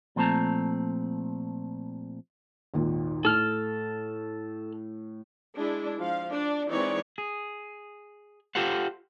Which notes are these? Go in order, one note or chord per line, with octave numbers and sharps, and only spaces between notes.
A#2 F3 A3 C4 A5 A#5
G#1 D#2 A#2
A2 A4 F6
G#3 D4 E4
F3 F5
D4 D5
E3 G#3 C4 D#4 C#5 D5
G#4
F4 G4 A4 C5 F#5